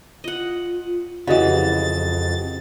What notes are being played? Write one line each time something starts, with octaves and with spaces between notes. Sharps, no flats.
F4 D#5 F#5
F2 C#3 E3 F#4 G4 D#5 A6